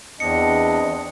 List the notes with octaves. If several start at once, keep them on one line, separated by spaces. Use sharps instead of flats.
E2 C4 D4 D#5 C#7